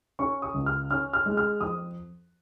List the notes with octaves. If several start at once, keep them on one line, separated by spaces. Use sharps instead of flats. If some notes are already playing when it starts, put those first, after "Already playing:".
C#4 C#6
D#6
C#2
F6
C#4 F6
F6
G#3
F6
F2 D#6